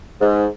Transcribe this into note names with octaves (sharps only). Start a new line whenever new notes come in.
G#2